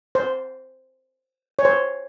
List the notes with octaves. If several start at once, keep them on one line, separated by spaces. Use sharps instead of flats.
C5
C#5
C5